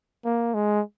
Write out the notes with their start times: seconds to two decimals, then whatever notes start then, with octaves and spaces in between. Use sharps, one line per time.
0.25 A#3
0.54 G#3